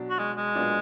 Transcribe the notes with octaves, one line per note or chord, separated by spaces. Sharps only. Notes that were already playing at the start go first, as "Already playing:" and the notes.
Already playing: B2 F#3 D4
F#4
G#3
G#3
A#2 F#3 B3 D4 F4